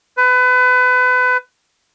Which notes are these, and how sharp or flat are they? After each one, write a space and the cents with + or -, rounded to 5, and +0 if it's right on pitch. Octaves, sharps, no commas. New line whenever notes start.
B4 +30